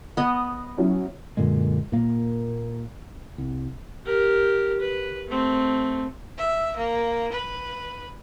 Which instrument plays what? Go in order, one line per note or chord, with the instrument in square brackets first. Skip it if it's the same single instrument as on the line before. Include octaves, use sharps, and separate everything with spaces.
[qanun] B3 D#5
[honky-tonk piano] F#3 C#4 E4
[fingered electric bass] F#2 A#2 D3 G#3
A#2 A#3
C2
[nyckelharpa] G4 A#4
B4
A3 C4
[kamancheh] E5
A#3
B4